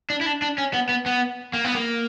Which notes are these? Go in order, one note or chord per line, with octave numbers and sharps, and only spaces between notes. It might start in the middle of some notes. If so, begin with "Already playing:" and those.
D4
E4
D4
D4
C#4
B3
B3
B3
A#3
B3
A#3